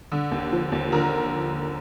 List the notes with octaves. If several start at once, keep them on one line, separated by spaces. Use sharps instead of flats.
D3
D#2
F3
D#2
D3 A#4